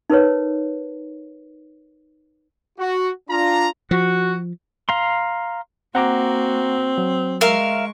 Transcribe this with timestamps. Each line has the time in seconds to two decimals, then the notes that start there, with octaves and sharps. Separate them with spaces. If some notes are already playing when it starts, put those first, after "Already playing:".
0.10 D#4 A#4 B4 C#5
2.79 F#4
3.29 D4 F4 A#5
3.91 F3 F#4
4.89 F5 A#5 C6
5.95 A#3 C4 F#4 F#5 A#5 D6
6.98 F#3
7.41 G#3 A#4 E5 F5 C#6